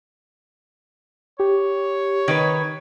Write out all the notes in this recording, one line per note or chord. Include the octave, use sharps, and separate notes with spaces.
G4 C#5
D#3 B4 G#6